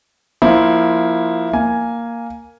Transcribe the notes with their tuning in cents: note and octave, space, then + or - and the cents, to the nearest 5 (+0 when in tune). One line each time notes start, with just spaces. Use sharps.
F3 +0 A#3 +15 E4 +0
A#3 +0 G#5 +0